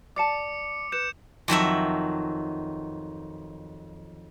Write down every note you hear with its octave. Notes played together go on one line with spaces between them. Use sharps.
D5 A5 D6 C#7
B4 G6 C#7 E7
F2 D#3 F#3 E5